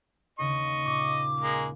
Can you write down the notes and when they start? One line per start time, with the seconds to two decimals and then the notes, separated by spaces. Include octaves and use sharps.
0.39 D#2 C#3 D#5 C#6
0.85 A#2 D6
1.40 G#3 A#3